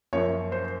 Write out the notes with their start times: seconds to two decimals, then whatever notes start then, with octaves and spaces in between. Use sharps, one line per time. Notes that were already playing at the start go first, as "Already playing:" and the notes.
0.13 F#2 F3 A#3 C#5
0.52 C5